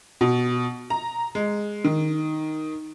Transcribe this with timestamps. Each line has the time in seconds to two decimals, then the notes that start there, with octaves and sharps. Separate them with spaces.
0.21 B2
0.90 A#5
1.35 G#3
1.85 D#3